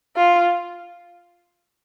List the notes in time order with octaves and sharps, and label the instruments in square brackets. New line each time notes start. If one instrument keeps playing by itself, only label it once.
[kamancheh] F4